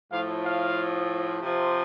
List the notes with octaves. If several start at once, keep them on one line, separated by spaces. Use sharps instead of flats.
A2 F3 F5
F5
C3 F3